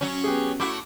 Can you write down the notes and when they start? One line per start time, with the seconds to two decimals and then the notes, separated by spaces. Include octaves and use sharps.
0.01 F#3 C#4
0.24 B3 G4 G#4
0.60 A3 E4 F#4 D6